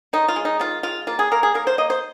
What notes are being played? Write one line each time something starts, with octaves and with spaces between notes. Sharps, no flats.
D#3 D#4
F4
G#3
D#4
D#3 F4
G#3 F4
A#3 F4
G#4
A#3 A#4
G#4
A#3 A#4
C5
A#3 D#5
C5